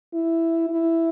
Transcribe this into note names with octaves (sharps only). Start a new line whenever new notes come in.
E4
E4